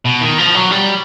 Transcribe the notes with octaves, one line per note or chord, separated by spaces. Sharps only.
B2
D#3
F3
F#3
G3